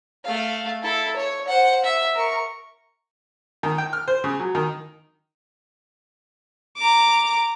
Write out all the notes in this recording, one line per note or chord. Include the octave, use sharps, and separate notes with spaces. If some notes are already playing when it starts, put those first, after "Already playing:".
A3 F5
E4 A4
C#5
C5 F#5
E5
A#4 C#6
D#3
G5
F6
C5
C#3
F#3
D#3
A#5 D6